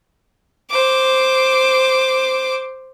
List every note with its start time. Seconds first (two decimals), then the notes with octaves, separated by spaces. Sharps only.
0.70 C5 D6